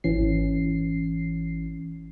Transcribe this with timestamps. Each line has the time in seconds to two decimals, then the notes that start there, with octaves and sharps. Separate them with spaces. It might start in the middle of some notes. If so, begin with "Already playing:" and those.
0.04 G#1 E3 C#4 C7